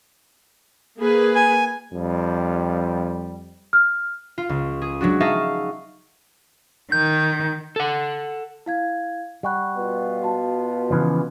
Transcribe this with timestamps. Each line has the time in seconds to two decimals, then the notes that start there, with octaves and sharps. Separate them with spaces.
0.98 A#3 G#4 B4
1.35 G#5
1.93 F2 G3
3.73 F6
4.38 F4
4.49 C#2
4.82 G#4
5.01 F#3 G#3 D4 F#4
5.20 D#4 G#4 E5 F5 A5 C#6
6.92 D#3 G6
7.76 A4 F#5
8.66 E4 F5 G#6
9.43 G3 F#5 C#6 F#6
9.77 B2 B3 F4
10.22 F#4 A5
10.90 C#3 E3 F3